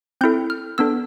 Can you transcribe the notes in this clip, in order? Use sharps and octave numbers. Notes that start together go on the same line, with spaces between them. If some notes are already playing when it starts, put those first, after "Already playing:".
C4 E4 A4 G6
F6
B3 D4 A4 E6